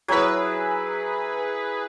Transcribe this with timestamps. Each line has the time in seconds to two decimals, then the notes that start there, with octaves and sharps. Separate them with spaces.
0.08 F#3 E4 G#4 B4